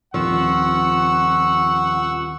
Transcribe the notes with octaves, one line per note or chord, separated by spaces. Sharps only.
D#1 F3 C4 F#5 C#6 E6